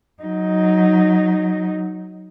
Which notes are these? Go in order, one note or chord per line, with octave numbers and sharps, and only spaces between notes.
F#3 D#4